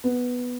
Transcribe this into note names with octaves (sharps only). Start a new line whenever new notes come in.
B3